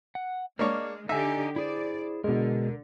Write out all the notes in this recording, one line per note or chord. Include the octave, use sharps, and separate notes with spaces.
F#5
G#3 A#3 D4 C#5 F6
D3 D#4 G4 E5 G#5
E4 G#4 C5 D5
B2 D3 G#3 A#4